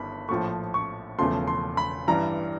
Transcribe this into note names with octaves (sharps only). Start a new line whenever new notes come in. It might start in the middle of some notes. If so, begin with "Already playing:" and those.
Already playing: G1 G2 D#3 B5
A#1 A2 F3 A3 C#6
C#6
E1 E2 C#3 F3 A3 C6
C6
B5
A1 G2 E3 G3 A#5